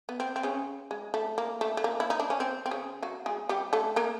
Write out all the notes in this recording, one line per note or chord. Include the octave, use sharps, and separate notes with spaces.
B3
C4
C4
C#3 C#4
G#3
A3
A#3
A3
A3
A#3
E4
D#4
D4
C#4
C4
C4
C#3 C#4
F#3 F#4
G#3 G#4
G3 G4
A3 A4
A#3 A#4